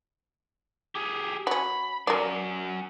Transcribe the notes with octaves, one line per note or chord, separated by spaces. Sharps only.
G4 G#4
F#3 C#4 B5
F#3 C#4 A#4 D5